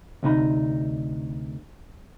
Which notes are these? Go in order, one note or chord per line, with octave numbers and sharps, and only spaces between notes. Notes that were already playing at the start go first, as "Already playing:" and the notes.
D2 C3 D#4 B5